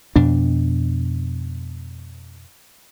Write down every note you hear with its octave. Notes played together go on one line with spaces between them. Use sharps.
F2 B2 D4